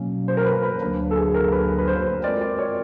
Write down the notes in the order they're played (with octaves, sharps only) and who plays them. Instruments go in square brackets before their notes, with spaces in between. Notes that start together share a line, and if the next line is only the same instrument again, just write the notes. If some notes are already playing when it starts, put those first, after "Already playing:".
Already playing: [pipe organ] B2 F#3 A#3 C#4
[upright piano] C5
A#4
B4
B4
[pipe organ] D2 D3 F#3 A#3 D4
[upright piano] A4
G#4
A#4
B4
B4
C5
[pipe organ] G#3 C4 F4 A#4 [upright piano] D5
[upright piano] D5
C#5